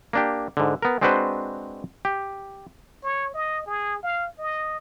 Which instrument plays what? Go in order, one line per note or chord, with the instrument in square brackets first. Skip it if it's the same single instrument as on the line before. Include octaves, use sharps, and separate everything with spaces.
[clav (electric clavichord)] A#3 D4 G4
G#2 D3
B3 A#4
G#3 C4 D4 F#4 B4 C5
G4
[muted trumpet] C#5
D#5
G#4
F5
D#5